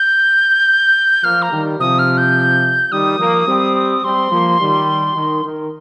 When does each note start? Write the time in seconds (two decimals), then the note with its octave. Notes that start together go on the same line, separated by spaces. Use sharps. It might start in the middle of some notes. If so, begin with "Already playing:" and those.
Already playing: G6
1.23 F3 A#3 F6
1.42 A#5
1.52 D#3 G3
1.80 C3 F3 D#6
1.99 F6
2.18 G6
2.91 D#3 G3 D#6
3.20 F3 A#3
3.48 G3 C4
4.04 G3 C4 C6
4.32 F3 A#3
4.60 D#3 G3
5.16 D#3
5.44 D#3